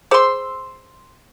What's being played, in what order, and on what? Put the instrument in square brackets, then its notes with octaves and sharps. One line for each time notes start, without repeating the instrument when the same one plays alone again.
[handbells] G#4 C5 D6 [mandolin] C6 E6